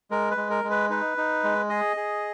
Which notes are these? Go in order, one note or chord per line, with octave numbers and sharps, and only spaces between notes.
G#3 A#4
B4
G#3
A#4
G#3
B4
D#4 B4
D#4
G#3
G#4 D#5
G#4